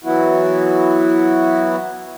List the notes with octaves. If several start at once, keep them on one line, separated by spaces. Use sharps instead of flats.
E3 F#3 B3 E4 F#4